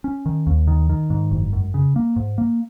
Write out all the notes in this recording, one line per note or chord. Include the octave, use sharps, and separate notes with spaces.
C#4
D#3
D#2
D#3
D#3
G#2
F#1
F#2
C#3
A#3
G#2
A#3